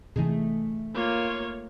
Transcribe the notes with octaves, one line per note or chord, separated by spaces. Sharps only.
C3 E3 A3 D#4 G#4
A#3 F4 C#5